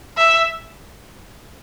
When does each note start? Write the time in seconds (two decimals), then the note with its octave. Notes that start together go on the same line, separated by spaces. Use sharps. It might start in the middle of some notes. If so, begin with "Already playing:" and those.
0.17 E5